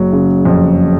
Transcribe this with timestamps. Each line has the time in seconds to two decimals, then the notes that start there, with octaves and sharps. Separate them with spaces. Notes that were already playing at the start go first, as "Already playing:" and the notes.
Already playing: F#1 F#3
0.13 C#3
0.45 F2